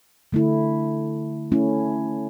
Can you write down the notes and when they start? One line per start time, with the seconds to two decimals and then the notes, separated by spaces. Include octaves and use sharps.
0.32 D3 A3 E4
1.52 A3 C#4 E4